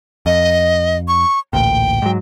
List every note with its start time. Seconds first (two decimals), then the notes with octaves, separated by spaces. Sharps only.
0.26 F2 D#5
1.08 C#6
1.53 A1 D2 A#2 G5
2.02 G#2 F#3